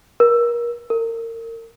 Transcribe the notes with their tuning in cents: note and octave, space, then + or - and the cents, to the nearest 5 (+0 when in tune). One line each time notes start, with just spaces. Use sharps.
A#4 +30
A#4 -30